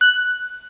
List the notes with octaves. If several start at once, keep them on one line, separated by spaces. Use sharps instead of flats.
F#6